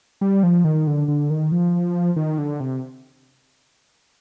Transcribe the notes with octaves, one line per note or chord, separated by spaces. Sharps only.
G3
F3
D#3
D3
D3
D#3
F3
D#3
D3
C3